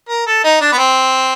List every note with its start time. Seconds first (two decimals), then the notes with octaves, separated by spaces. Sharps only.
0.09 A#4
0.27 A4
0.44 D#4
0.61 D4
0.72 B3
0.78 C4